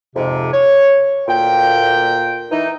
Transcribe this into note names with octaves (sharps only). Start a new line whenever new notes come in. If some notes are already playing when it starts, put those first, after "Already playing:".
F2 G#2 C3
C#5
D2 A#2 A#3 G5
E3 D#4